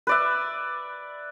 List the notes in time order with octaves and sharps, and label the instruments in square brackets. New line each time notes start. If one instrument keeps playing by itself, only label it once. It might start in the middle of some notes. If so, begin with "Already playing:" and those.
[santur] B4 D5 E5